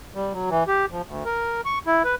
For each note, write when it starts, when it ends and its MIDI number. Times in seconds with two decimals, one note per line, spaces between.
0.15 0.33 55
0.33 0.50 54
0.50 0.64 52
0.67 0.86 67
0.91 1.02 53
1.07 1.24 38
1.25 1.61 70
1.65 1.79 85
1.87 2.03 64
2.05 2.15 71